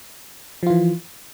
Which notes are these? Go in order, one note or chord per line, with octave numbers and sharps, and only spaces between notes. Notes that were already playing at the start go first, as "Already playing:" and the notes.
E3 F3 F4